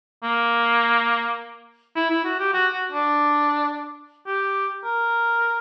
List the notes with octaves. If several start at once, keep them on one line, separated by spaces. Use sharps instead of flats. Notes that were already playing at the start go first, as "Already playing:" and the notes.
A#3
E4
E4
F#4
G4
F#4
F#4
D4
G4
A#4